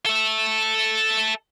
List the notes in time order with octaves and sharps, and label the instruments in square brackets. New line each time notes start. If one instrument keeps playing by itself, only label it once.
[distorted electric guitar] A4 E5